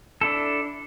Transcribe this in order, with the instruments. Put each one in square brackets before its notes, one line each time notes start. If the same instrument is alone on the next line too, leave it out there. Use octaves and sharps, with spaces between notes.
[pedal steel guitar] D4 E4 A4